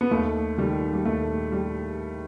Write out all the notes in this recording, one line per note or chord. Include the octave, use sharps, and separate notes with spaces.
B3
D#2 A3
D#3 G3
G3
D#2 A3
G3